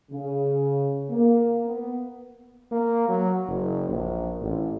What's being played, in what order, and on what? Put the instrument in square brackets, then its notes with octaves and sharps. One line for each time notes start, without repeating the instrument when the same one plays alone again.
[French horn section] C#3
A#3
B3
[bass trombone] A#3
F#3
F#1
A#1
A1